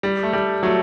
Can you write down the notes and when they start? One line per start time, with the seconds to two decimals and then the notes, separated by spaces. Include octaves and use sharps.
0.03 G3
0.23 A3
0.33 G3
0.63 F#3 A3